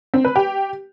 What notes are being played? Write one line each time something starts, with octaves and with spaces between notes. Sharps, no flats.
C4
B4
G4